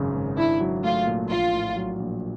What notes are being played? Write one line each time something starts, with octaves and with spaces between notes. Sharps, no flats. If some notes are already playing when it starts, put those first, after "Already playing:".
Already playing: G#1 F#2 C#3
G#1
D4 E4
F#3
A3 F4
A#2
A#1 F4
A2
F#3
A#1